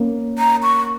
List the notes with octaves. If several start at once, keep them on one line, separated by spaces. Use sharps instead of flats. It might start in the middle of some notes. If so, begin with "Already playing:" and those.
Already playing: A#3 C#4
A#5
C#6